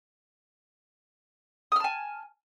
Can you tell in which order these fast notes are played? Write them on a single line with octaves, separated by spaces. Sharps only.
D#6 F6 A5 G#5